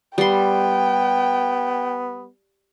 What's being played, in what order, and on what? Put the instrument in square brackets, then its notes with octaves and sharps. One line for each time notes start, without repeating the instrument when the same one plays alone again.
[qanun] G3 C6 [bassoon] B3 [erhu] G5